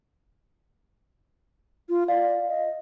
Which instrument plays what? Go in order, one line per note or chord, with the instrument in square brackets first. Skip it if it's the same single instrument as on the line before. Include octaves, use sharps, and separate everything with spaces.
[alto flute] F4
[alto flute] D5 [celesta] F5
[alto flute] D#5